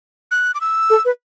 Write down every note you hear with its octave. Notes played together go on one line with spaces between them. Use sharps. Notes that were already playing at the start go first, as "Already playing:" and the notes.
F#6
D6
E6
A4
B4